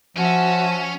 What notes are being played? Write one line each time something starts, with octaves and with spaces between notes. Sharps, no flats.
F3 C#4 F#4 E5